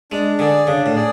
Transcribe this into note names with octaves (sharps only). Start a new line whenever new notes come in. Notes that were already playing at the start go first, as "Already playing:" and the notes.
G#3 D4
D3 G#4 D5
C#3 D4
A2
G#4 D5